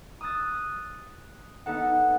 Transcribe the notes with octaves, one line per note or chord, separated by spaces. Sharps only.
D#6 E6 F#6 A6
B3 D#4 A4 F#5